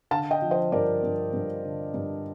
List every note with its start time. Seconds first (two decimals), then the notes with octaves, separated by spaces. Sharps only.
0.11 D3 F5 A5
0.31 D#5 G5
0.42 F3
0.51 C5 D#5
0.72 G2 A#4 D5
1.03 G2
1.33 G2
1.65 D3
1.94 G2